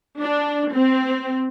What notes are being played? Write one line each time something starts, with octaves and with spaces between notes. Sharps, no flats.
D4
C4